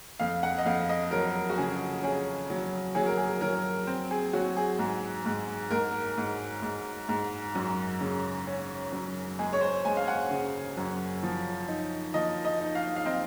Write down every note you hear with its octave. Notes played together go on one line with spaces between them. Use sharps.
F2 F5
F#5
D#5
F2 F5
D#5
F#3 A#4
F#4
C#3 G#4
C#4 G#4
F#3
F#3 G#4
A#4
G#4
F#3 A#4
C4
G#4
F#3 F#4
G#4
G#2
G#2
G#2 A#4
G#2
G#2
G#2
F#2
C#3
C#4
F#2
G#3 G#4
C#5
C5
G#3 G#5
F5
F#5
C#3
F#2
F3
D#4
F3 D#5
D#5
D#4
F5
F5
C4 D#5